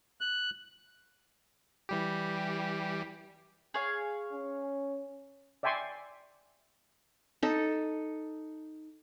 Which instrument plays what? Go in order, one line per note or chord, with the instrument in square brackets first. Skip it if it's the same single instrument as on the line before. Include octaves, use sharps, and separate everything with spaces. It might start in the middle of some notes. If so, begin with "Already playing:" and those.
[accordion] F#6
[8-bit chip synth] E3 G3 G4
[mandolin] G#4 C#5 F5
[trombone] C#4
[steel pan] D5 E5 G5 G#5 C6 C#6
[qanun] D#4 A4